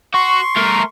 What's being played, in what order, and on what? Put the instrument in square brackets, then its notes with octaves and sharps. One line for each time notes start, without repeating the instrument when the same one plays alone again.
[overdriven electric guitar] F#4 [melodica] C6 C#6
[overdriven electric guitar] A3 A#4